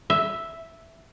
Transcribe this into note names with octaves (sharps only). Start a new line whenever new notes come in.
E5